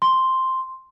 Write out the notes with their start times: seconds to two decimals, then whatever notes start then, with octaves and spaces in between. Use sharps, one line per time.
0.02 C6